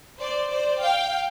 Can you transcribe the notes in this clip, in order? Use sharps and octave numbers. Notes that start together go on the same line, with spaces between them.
C5 D5
C5 D5
F5 G5